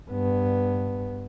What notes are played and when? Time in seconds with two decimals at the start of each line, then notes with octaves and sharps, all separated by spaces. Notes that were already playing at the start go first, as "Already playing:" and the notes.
0.11 G2 B3